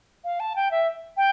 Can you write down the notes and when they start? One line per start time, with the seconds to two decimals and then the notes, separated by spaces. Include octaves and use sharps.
0.24 F5
0.40 A5
0.56 G5
0.71 E5
1.17 G5